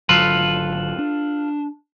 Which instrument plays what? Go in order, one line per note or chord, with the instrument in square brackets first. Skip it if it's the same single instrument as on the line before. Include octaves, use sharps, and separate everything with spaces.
[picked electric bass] G#1 D3 F#3 [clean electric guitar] F4 A4 B4
[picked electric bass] D4